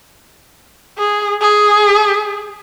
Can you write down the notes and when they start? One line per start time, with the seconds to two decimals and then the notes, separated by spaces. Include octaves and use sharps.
0.98 G#4
1.41 G#4